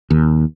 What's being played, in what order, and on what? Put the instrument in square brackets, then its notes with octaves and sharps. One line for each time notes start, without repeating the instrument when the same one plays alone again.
[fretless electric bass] D#2